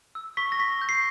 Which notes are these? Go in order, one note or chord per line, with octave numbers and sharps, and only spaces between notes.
E6
C#6 B6
A#6
C#6 B6
G6
C7